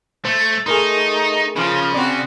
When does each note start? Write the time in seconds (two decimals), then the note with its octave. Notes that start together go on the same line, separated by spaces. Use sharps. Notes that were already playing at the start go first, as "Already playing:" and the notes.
0.25 A3 C5
0.66 A3 D#4 G#4 A#4 C6
1.56 C#3 F3
1.95 C4 F#4 D5